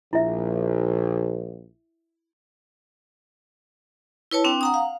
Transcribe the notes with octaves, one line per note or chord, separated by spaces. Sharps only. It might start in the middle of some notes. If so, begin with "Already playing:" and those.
A#1 E4 E5
E4 B4 C#5 A5
C4 D4 G5
F#5 A#5 D#6
F5